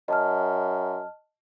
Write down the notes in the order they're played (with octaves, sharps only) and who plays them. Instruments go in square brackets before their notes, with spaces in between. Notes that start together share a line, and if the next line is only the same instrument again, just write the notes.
[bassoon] F#2 [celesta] D#5 A5 F6